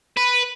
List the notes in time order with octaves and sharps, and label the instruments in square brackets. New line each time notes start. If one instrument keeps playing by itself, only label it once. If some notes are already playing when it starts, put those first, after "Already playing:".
[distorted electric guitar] B4